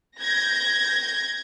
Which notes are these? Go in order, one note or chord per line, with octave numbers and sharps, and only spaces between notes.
G6 G#6 A#6